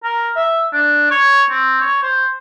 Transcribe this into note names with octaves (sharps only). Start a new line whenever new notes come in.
A#4
E5
D4
C#5
C4
C#5
C5